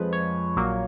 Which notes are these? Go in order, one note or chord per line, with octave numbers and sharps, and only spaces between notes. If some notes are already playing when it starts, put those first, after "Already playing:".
Already playing: F2 F3 G#3 B4
C#5
A#1 A#2 F#3 A#3